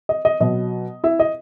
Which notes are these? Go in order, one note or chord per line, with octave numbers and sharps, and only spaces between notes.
D#5
D#5
B2 F#3 D#5
E4 E5
D#5